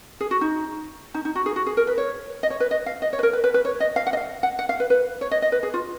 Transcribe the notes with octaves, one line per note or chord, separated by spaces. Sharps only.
G#4
F#4
D#4
D#4
D#4
F#4
G#4
F#4
G#4
A#4
B4
C#5
D#5
C#5
B4
D#5
F5
D#5
C#5
B4
A#4
B4
B4
B4
C#5
D#5
F5
F#5
D#5
F5
F#5
F#5
F5
B4
B4
C#5
D#5
D#5
B4
G#4
F4